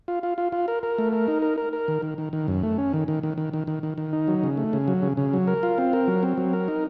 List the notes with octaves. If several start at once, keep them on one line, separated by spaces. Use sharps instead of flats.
F4
F4
F4
F4
A#4
A#4
A3
A#4
D#4
A#4
A#4
A#4
D#3
D#3
D#3
D#3
F#2
A3
C#4
D#3
D#3
D#3
D#3
D#3
D#3
D#3
D#3
D#4
F#3
C#3
A3
C#3
F#3
C#3
C#3
F#3
A#4
F4
C4
A#4
F#3
C4
F#3
A#4
D#4